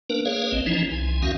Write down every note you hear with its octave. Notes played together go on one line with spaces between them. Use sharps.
A#3 D4 A#4 B4
A#3 G#4 B4 C#5 F5
A1 C4 D#5
E3 F3 C#4 D#4 E4
C2 G#5
D#2 D#3 C#4 F#4 E5 F5